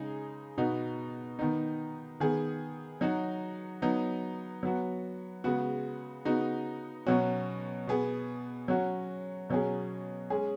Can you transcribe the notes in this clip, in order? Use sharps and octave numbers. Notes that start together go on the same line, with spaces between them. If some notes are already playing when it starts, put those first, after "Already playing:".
Already playing: C#3 G#3 D#4 G#4
B2 B3 D#4 F#4
D#3 B3 D#4
D#3 B3 G#4
F#3 D#4 F#4
F#3 B3 D#4
F#3 B3 F#4
C#3 G#3 B3 F#4
C#3 B3 D#4 F#4
B2 F#3 C#4 F#4
B2 B3 G#4
F#3 C#4 F#4
B2 F#3 C#4 G#4
G#3 C#4 G#4